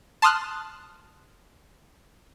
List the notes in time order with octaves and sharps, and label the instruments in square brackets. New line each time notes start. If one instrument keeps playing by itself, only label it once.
[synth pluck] A5 C6 D#6 F6 F#6